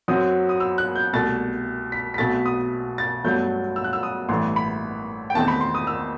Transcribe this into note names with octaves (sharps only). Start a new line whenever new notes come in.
F#2 F#3 C4 D#6
D#6
E6
F#6
G6
C2 B2 A3 A6
B6
B6
B1 B2 A3 C4 A6
D#6
A6
G1 G2 F#3 A3 G6
E6
F#6
E6
D#6
A1 G2 E3 A3 C6
B5
G5
E2 D#3 A3 C4 A5
B5
C6
D#6
E6